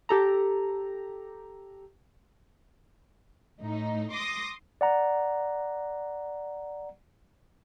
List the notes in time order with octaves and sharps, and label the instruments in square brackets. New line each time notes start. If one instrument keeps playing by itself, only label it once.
[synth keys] G4 A4 A#5
[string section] A2 D#4
C6 D6 D#6 A#6
[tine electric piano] D5 F#5 A#5